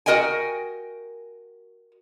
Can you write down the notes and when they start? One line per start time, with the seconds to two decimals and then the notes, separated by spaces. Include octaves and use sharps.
0.06 F#4 A#4 D#5 G5 G#5